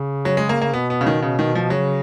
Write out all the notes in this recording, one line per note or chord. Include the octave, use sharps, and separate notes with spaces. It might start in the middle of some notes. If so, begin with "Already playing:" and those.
Already playing: C#3
F#3
G#3
A#3
A#3
B2 B3
B3
C#3
D#3
C#3
D#3
F3
C#3 F#3